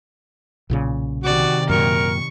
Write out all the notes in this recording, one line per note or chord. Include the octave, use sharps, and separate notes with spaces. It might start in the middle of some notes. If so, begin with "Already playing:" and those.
B1 A#2 C#3
C3 D#3 F#4 D5
F#2 A#2 A#4 C#6